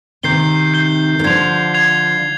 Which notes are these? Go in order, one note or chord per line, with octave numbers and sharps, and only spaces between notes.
C3 D#3 G6 C7 G7
G6 C7 G7
D#3
D3 F3 G#6 C7 F7
G#6 C7 F7